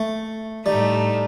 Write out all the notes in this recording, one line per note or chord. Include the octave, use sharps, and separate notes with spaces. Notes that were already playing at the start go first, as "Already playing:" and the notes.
Already playing: A3
A2 G3 A3 D#4